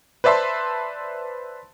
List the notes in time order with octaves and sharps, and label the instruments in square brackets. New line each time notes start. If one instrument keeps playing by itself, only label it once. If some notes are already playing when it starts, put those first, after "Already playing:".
[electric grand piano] B4 C5 D5 E5 A5 C6